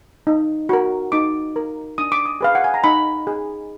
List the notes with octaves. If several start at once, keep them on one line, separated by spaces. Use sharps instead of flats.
D#4
F#4 A#4
D#4 D6
A#4
D4 D#6
D6
D#6
G#4 B4 F5
F#5
G#5
A#5
D#4 B5
G#4